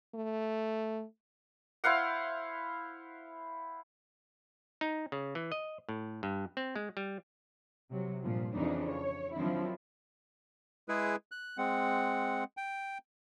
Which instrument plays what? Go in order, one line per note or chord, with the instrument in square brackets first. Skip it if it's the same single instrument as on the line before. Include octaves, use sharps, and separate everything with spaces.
[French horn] A3
[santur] E4 C5 F5 F#5
[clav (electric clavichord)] D#4
C#3
E3
D#5
A2
G2
C4
G#3
G3
[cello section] C3 F#3
G2 A#2 F3
F2 C#3 E3 D4 D#4
C#5
D#3 F3 F#3 C4 D4 E4
[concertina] G#3 E4 G#4 B4
F#6
G#3 C4 F#5
G5